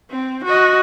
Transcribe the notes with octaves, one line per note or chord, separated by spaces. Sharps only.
C4
F#4 D#5